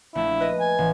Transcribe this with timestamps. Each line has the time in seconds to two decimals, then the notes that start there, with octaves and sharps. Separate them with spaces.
0.15 A#1 A3 E4
0.40 B4 D#5
0.60 G#5
0.78 A1